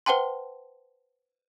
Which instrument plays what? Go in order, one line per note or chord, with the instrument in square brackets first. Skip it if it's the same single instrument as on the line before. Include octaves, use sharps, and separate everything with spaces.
[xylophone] B4 C5 F#5 G5 A5 C6